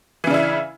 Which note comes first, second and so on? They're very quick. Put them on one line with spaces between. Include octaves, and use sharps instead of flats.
E3 C#3 D4 E4